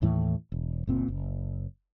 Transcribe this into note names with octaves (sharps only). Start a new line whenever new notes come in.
D#2 A2 E3 A3
E1
F#1 A#2 C4
F#1